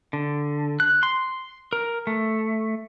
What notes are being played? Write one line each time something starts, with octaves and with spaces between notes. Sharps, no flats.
D3
F#6
C6
A#4
A3